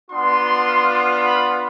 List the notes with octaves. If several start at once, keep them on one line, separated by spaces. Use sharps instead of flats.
B3 D4 F4 C6
B5